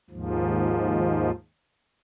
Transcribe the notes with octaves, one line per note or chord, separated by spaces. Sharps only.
D#2 G#2 F3